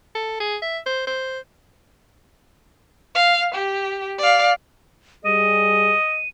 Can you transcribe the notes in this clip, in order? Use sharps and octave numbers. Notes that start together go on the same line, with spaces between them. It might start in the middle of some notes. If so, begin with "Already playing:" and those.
A4
G#4
E5
C5
C5
F5
G4
D5 F5
G3 G#4 D#5 D#7